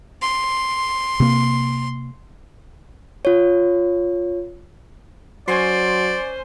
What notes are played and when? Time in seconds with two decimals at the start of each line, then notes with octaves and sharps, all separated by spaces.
0.22 C6
1.20 C3 A#3
3.25 F4 C#5
5.48 F#3 C#4 C5 D5 G#5 C6